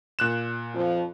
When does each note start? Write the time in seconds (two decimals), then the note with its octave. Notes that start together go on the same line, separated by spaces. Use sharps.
0.19 A#2 F#6 E7
0.75 F2 F3